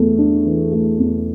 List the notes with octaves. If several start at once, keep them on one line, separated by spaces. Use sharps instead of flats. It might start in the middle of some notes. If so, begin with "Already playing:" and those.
Already playing: E2 A3
D4
E3
A3
E2